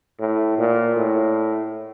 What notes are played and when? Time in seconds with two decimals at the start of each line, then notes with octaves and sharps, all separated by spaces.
0.20 A2
0.58 A#2
0.97 A2